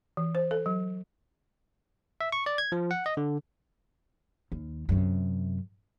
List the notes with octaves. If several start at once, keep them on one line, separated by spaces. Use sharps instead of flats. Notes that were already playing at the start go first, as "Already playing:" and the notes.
E3
C5
A4
F#3
E5
C#6
D5
G#6
F3
F#5
D#5
D3
D#2
F#2 C3